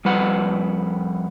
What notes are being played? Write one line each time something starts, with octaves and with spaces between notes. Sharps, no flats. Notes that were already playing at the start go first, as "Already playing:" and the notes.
F2 G3 B4 F#5